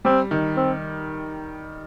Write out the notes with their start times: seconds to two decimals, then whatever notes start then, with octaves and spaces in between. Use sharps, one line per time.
0.05 G3 C4
0.31 D#3
0.57 C4